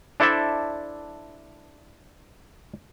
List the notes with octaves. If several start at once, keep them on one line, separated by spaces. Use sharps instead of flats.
D4 E4 A4 C5 D5 E5